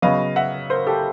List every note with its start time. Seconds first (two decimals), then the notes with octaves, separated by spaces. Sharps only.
0.02 C#3 F#3 B3 D#5 F5
0.36 E5 F#5
0.70 A#4 C5
0.87 G4 A4